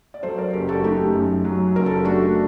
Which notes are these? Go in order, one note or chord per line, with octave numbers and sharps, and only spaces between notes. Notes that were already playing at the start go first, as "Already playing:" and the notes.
D5
F#3 A4 C5
A#4 D5
F#1 G4 A#4
F#4 A4
A3 D#4 G4
F#2
F#3
F#1 A#4
A4
G4
A3 D4 F#4